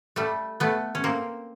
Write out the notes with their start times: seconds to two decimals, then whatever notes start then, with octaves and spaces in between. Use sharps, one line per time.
0.16 G3 A3
0.60 A3 B3
0.95 C#4
1.04 A#3 C4